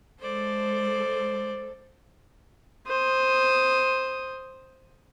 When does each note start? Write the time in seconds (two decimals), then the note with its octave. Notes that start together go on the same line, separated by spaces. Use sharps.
0.20 G#3 A4 C5 D5
2.87 C5 D#6